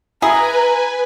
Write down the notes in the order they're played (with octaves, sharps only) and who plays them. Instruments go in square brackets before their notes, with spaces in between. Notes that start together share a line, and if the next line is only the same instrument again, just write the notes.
[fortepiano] E4 [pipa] G#4 [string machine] B4 G#5 [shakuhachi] A#5